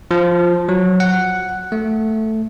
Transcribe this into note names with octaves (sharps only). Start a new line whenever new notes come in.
F3
F#3
F#5
A3